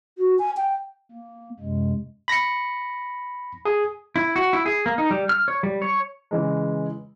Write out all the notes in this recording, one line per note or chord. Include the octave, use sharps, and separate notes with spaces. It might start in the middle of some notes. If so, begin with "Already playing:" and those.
F#4
G#5
G5
A#3
F#2 C3 G#3
B5 A#6 B6 C#7
G#4 G#5
E4
F#4
E4
G#4
A#3
D#4
G3
F6
C#5
G3
C#5
C#3 E3 G#3